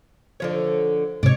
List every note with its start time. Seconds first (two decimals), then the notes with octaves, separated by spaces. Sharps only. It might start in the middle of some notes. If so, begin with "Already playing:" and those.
0.40 D3 F3 C#5
1.23 G#2 C3 C#5 D5